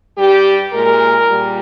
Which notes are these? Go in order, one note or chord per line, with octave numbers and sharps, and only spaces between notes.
G2 G3 G4
A#2 G#3 A#4
A#2 G3